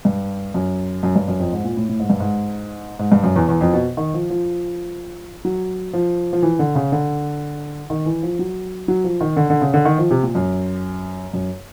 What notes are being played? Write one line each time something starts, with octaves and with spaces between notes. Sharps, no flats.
G2
F#2
F#2
G2
F#2
F2
G#2
A#2
A2
A2
G#2
G2
G#2
G#2
G2
F#2
E2
E2
F2
B2
D#3
F3
F3
F#3
F3
F3
E3
D3
C#3
D3
D#3
E3
F3
F#3
F#3
F3
D#3
D3
D3
C#3
D3
D#3
F3
C3
A#2
F#2
F#2